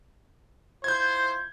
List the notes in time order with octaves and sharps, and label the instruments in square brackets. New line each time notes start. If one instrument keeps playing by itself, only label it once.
[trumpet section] E4 F4 C5 [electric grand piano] G6 G#6